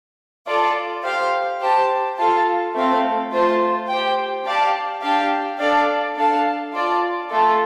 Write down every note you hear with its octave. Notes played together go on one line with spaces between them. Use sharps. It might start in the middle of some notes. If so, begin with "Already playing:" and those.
F4 A4 D5 A5
G4 C5 F5
G4 C5 A5
F4 A4 F5 A5
A3 C4 A4 F5
A3 F4 C5 A5
G4 C5 G5
D4 G4 D5 F5 A5
D4 G4 F5 A5
D4 A4 D5 F5
D4 A4 F5 A5
F4 D5 A5
A3 F4 A4